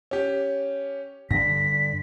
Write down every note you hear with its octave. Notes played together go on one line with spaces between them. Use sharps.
C#4 G4
G2 D3 A#6 B6